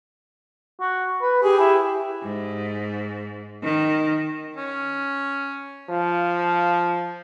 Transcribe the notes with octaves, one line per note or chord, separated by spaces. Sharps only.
F#4
B4
G4 G#4
E4
G#2
D#3
C#4
F3 F5